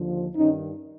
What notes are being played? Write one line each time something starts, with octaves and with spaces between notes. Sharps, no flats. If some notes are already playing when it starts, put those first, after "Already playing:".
Already playing: D#2 D3 F3
G2 D#3 C#4 D#4